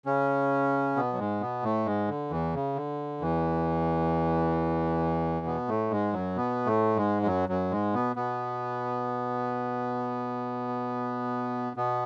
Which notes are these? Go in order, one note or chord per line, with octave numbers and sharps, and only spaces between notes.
C#3 C#4
B2 B3
F#3
G#2 G#3
B2 B3
A2 A3
G#2 G#3
D3
E2 E3
C#3
D3
E2 E3
B2 B3
A2 A3
G#2 G#3
F#2 F#3
B2 B3
A2 A3
G#2 G#3
G#3
F#2 F#3
F#2 F#3
G#2 G#3
B2 B3
B2 B3
B2 B3